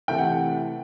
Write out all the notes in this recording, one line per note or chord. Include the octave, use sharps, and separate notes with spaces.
C3 E3 A3 G5
F#5